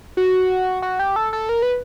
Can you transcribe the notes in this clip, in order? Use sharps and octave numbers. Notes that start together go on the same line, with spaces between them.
F#4
F#4
G4
A4
A4
A#4
B4